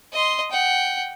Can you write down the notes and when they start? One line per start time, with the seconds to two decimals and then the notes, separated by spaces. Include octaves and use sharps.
0.13 D#5 C6
0.52 F#5 G5